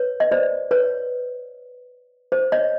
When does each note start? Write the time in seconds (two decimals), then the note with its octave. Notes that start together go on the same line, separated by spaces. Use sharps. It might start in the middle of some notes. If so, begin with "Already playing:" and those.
Already playing: B4 C#5
0.20 D#5
0.31 C5 D5
0.71 B4 C#5
2.32 C5
2.52 C#5 D#5